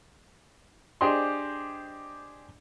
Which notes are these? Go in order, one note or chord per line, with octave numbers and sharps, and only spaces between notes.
D4 G4 G#4 C5 D#5 C6